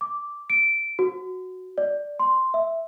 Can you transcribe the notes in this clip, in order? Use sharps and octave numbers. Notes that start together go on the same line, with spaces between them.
D6
D7
F#4
D5
C6
E5